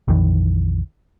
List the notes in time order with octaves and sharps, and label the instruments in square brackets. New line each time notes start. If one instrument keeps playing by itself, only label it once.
[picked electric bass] A#1 F2 D#3 E3